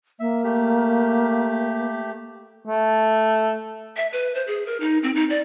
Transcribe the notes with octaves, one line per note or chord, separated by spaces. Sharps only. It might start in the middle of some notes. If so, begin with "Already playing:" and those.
A#3 E5
A3 G4
A3
E5
B4
C5
G#4
A#4
D#4
C4
D#4
D5